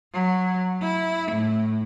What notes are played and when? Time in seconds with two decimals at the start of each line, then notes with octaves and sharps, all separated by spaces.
0.13 F#3
0.82 E4
1.31 A2